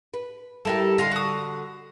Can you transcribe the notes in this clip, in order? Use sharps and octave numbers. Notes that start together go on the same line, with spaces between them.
B4
G3 E4 G4 A4 A#4
D3 A4 D#5 F5 C6
F#4 D#6